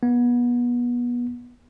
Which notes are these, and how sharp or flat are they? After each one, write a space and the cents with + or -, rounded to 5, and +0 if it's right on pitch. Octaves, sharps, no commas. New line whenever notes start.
B3 -30